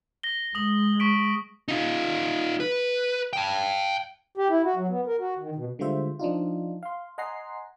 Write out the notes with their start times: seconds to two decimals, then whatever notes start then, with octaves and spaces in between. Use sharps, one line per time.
0.23 A#6 G7
0.55 G#3 D#6 F#7
1.00 C#6 B6 D7
1.68 D#4 F4
2.60 B4
3.33 G5 A5
4.37 G4
4.50 E4
4.64 F#4
4.76 F#3
4.89 B3
5.07 A#4
5.20 F#4
5.39 D#3
5.55 B2
5.79 D3 G3 G#3 F4 C5 E5
6.19 F3 D4 D#4 F4
6.83 F5 C6
7.18 D#5 F#5 G#5 A#5 C6 C7